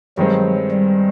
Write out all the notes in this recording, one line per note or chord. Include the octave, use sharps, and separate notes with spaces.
G2 D#3 F#3 G#3 C4
G3